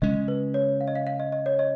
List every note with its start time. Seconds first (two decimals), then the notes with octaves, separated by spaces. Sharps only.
0.02 C#3 G#3 C#4 D#5
0.28 B4
0.54 C#5
0.81 F5
0.88 D#5
0.95 F5
1.07 F5
1.20 D#5
1.32 D#5
1.46 C#5
1.59 D#5